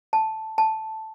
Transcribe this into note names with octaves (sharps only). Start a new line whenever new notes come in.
A5
A5